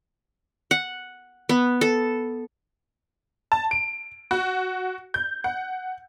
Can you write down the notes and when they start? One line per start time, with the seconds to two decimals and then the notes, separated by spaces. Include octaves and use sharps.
0.71 F#5
1.49 B3
1.81 A4
3.52 A5
3.71 D7
4.31 F#4
5.14 G6
5.44 F#5